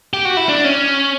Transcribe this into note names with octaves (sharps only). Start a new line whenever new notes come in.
G4
F#4
E4
D4
C#4